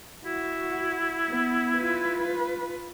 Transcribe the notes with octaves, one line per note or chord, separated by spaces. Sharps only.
E4 F#4
B3
F4 B4